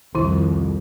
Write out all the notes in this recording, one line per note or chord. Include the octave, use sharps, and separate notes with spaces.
C2 F2 D#3 E4